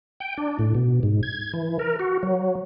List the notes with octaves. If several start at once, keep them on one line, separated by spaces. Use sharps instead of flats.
G5
D4
A2
B2
G#2
G#6
E3
A#4
F#4
F#3